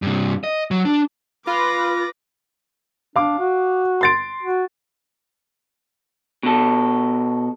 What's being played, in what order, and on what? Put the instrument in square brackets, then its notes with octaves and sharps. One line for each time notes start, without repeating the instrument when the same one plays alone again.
[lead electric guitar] G2 C3
D#5
F#3
D4
[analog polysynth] F4 [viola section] B4 [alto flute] B5 [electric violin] D6 A#6
[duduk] D4 [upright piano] F5 D6
[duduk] F#4
[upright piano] C6 A6 D7
[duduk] F#4
[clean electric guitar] B2 A4